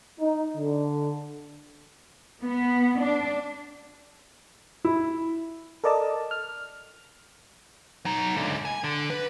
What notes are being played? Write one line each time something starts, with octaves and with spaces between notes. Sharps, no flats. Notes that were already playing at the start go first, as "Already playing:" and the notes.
D#4
D3
B3
D4
E4
A4 A#4 D5 D#5 A5
F6
F#3 D#4
C#2 D3
G#5
D3
B4